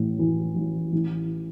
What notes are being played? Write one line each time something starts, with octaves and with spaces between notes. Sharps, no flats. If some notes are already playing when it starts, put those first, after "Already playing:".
Already playing: A1 A2
E3
A1
A1